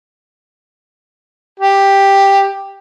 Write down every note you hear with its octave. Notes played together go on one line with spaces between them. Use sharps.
G4